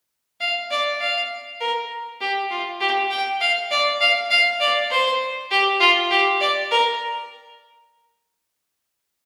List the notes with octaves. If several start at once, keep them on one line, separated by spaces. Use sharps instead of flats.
F5
D5
F5
A#4
G4
F4
G4
G5
F5
D5
F5
F5
D5
C5
G4
F4
G4
D5
A#4